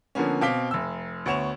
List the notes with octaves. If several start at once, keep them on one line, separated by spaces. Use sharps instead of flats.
D3 F3 A#3 B3 C#4
B2 C4 F5 D6 B6 G7
F1 E6
D2 B3 C#5 E7 F7